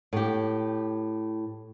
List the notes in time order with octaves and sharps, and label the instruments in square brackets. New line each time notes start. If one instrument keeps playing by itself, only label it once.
[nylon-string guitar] A2 G4